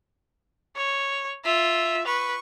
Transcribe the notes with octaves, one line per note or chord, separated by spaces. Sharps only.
C#5
F4 E5
B4 C#6